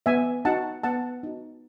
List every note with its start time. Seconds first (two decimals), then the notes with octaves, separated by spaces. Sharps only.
0.06 B3 E5 G#5
0.45 D#4 F#4 F#5 A5
0.83 B3 F#5 A5
1.23 D#4 F#4